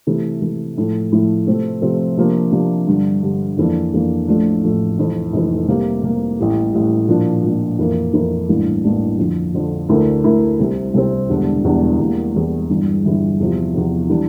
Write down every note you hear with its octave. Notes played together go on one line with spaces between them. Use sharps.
C3 E3 A3
C3 E3 A3
A2 F3 A3 E4
A2 F3 A3 E4
C3 F3 A3 C4
C3 F3 A3 C4
C3 F3 A#3 D4
C3 F3 A#3 D4
G2 D3 G3
G2 D3 G3
F2 E3 A#3 D4
F2 E3 A#3 D4
A1 A2 F3 A3 D4
A1 A2 F3 A3 D4
F1 F2 E3
F1 F2 E3
C3 G3 A#3
C3 G3 A#3
A1 A2 G3
A1 A2 G3
A#2 F3 A#3 D4
A#2 F3 A#3 D4
F2 E3 A#3 E4 A#4
F2 E3 A#3 E4 A#4
A1 G2 E3 A#3 D4
A1 G2 E3 A#3 D4
F2 D3 F3
F2 D3 F3
D2 D3 A3 E4 A#4
D2 D3 A3 E4 A#4
C2 C3 G3 C4
C2 C3 G3 C4
E1 E2 D3 G3 D4
E1 E2 D3 G3 D4
E2 E3 G3 A#3
E2 E3 G3 A#3
G1 G2 E3
G1 G2 E3
E2 C3 F3
E2 C3 F3
E3 G3 D4